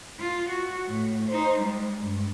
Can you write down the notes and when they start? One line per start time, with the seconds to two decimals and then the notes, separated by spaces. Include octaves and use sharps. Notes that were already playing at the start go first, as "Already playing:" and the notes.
0.19 F4
0.49 F#4
0.88 A2
1.28 D#4 C5
1.60 G3 G#3
2.01 G2